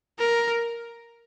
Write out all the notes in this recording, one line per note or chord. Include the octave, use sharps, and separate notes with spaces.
A#4